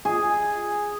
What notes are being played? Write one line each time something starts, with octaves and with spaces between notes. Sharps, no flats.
G#4